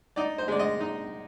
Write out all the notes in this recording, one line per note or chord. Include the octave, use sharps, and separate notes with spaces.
D#4 D5
C5
G#3 D5
D#5
D#4